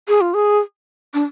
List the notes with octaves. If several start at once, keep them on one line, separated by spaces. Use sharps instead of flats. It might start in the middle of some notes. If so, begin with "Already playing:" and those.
G#4
F4
G#4
D4